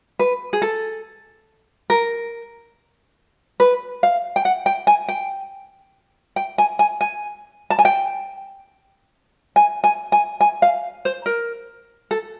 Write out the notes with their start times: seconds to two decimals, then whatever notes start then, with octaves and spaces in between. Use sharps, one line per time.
0.19 B4
0.53 G#4
0.62 A4
1.90 A#4
3.60 B4
4.03 F5
4.36 G5
4.45 F#5
4.66 G5
4.87 G#5
5.08 G5
6.36 G5
6.58 G#5
6.79 G#5
7.01 G#5
7.70 A5
7.79 G#5
7.85 G5
9.56 G#5
9.84 G#5
10.12 G#5
10.41 G#5
10.62 F5
11.05 C5
11.26 A#4
12.11 A4